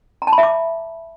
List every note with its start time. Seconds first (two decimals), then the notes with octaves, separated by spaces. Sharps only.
0.22 A#5
0.27 A5
0.33 B5
0.38 E5
0.43 D6